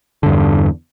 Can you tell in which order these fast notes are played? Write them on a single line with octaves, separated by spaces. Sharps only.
D3 G2 E2